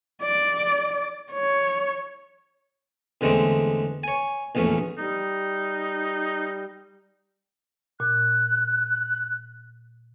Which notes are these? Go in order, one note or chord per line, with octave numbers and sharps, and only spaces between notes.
D5
C#5
E2 D3 G#3 A3 C4 D4
C#5 G#5
A#1 E2 A3 C#4
G3 D#4
A#2 F#6